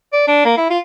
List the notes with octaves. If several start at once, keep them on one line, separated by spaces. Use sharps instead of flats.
D5
D4
A#3
E4
F4